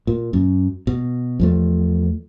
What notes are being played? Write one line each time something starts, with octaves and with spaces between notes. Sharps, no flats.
A#2
F#2
B2
E2 F3 A3